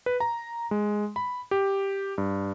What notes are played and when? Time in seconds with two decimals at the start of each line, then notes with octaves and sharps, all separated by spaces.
0.06 B4
0.20 A#5
0.71 G#3
1.16 B5
1.51 G4
2.18 G2